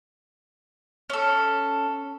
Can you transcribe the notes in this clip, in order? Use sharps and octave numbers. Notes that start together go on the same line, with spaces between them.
C#4 A4